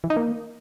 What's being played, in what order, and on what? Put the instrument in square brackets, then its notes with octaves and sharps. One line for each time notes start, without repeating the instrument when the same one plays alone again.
[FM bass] E3
D#4
A#3